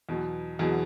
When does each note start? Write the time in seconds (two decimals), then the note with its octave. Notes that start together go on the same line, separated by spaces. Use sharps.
0.09 E2 B2 F#3
0.59 E2 B2 F#3 G#4